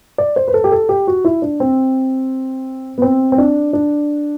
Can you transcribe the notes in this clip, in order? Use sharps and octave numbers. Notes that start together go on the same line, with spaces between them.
D5
C5
B4
A4
G4
A4
G4
F#4
E4
D4
C4
B3
C4
C4
D4
D4